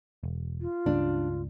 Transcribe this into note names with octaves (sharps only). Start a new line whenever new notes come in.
E1
F4
C#2 G2 C#3 D4